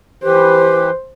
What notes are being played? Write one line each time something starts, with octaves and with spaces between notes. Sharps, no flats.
E3 G4 B4 C5